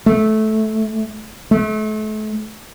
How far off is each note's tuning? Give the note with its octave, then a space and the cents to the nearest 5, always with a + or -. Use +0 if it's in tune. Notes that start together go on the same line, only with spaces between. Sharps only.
A3 -15
A3 -35